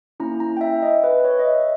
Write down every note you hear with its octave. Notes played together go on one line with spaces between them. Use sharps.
A#3 C#4 E4 A#5
A#5
G5
E5
D#5
B4
C#5
D#5
E5